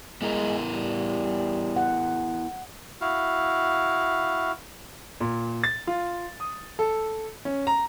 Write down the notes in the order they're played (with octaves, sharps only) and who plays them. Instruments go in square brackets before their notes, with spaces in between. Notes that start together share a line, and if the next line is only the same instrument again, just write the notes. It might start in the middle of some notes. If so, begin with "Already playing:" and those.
[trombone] G#3 [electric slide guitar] B3 E4 A#4
[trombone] G3
[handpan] F#5
[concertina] E4 F#4 F5
[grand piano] A#2
A6
F4
D#6
A4
C#4
A#5